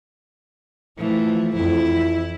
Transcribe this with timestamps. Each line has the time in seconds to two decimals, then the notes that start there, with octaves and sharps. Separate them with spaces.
0.98 E3 F3 A3
1.55 F2 E4